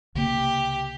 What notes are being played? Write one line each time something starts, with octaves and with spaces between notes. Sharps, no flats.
C2 C#3 A#3 G4